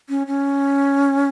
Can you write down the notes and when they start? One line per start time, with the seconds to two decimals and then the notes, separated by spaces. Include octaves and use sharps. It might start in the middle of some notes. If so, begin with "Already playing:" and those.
0.09 C#4
0.27 C#4